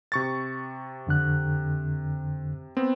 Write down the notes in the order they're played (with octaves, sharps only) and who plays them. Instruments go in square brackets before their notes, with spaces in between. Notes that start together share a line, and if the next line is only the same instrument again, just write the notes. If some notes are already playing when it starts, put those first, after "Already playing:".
[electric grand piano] C3 C#6 A6
[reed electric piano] F2 D3 F#6
[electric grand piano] B3 C4